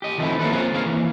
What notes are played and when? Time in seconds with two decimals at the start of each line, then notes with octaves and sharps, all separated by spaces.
0.02 G4 D#5
0.18 D#3 F3 A3 A#3 C4 E4
0.39 A#3 C#4 F#4 A4 B4
0.52 A#3 C4 F4 G#4 C5 C#5
0.73 D#2 A#3 G#4 F5
0.86 E3